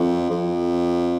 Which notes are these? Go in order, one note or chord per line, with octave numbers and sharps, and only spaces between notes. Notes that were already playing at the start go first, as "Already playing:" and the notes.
Already playing: F2
F2